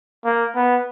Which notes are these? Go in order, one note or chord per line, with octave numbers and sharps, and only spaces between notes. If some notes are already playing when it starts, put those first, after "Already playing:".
A#3
B3